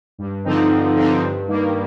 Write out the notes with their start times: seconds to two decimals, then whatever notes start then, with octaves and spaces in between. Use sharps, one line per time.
0.18 G2
0.44 D3 F3 C4 D#4
0.69 G2
0.96 D3 F3 C4 D#4
1.22 G2
1.47 D#3 G3 A#3